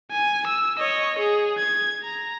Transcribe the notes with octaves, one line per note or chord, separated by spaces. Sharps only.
G#5
E6
C#5 D#5
G#4
G#6
A#5